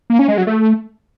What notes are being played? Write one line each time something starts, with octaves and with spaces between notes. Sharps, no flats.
A#3
C#4
G#3
F#3
A3